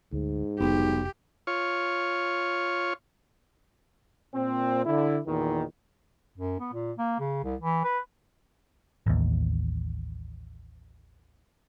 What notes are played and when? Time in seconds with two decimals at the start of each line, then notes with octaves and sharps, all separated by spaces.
0.12 D2 G#2
0.60 F1 B1 G4
1.47 F4 C#5
4.34 A#2 C4
4.86 D3 E4
5.27 E2 A#2 D#3
6.38 F#2
6.60 B3
6.73 A#2
6.98 A#3
7.20 C#3
7.44 C2
7.61 E3
7.84 B4
9.06 A1 D#2